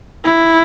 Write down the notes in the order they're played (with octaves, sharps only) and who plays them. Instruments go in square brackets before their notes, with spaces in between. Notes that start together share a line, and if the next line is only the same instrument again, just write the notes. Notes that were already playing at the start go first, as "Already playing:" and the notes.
[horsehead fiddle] E4